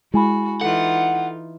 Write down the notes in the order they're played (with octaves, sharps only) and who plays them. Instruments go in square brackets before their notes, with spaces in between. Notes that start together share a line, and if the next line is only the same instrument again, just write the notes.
[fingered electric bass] G#3 [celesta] E4 G#5 B5 [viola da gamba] F#4
[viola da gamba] E3 D#4 F4 [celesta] A4 [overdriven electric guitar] F#5